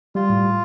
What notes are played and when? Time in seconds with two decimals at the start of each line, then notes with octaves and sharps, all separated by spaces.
0.15 G3 F4
0.30 A2